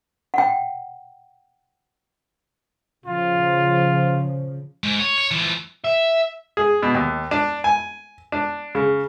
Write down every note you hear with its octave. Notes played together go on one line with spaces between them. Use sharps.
F#5 G5
C#3 F3 F4
G#2
C#5
C#5
E3 F3
E5
G#4
B2
D#2
D4
G#5
D4
C#3